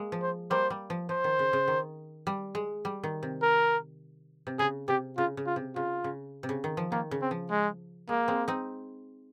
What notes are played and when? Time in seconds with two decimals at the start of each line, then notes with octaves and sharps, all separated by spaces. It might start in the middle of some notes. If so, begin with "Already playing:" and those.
Already playing: G#3 A#3
0.12 F3
0.22 C5
0.51 G3 A#3 C5
0.70 G3
0.90 F3
1.09 F3 C5
1.24 D#3
1.39 C#3
1.53 C#3
1.68 D#3
2.27 G3
2.55 G#3
2.85 G3
3.03 D#3
3.23 C3
3.42 A#4
4.47 C3
4.59 C#3 G#4
4.88 C3 G4
5.17 C#3 F4
5.37 C#3
5.46 F4
5.56 C3
5.76 C#3 F4
6.04 C#3
6.43 C3
6.49 C#3
6.64 D#3
6.77 F3
6.92 D#3 A#3
7.11 C#3
7.21 C4
7.31 F3
7.51 G#3
8.09 G#3 A#3
8.28 G#3 C4
8.48 C4 D#4